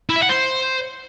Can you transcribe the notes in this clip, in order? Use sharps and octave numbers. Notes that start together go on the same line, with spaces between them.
E4
E5
F#5
C5